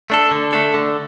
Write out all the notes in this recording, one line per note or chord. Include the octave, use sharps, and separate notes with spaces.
A3 D4 A4
D3
A3 D4 A4
D3